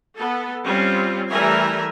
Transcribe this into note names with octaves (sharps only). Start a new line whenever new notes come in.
B3 A4
G3 C4 C#4 F4
E3 G3 A3 A#4 E5 G#5